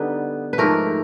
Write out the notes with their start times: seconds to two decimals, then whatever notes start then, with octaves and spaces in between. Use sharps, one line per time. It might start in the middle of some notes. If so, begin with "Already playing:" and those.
Already playing: D3 G3 B3 D#4 B4
0.53 B4
0.58 G#2 F3 A3 A#4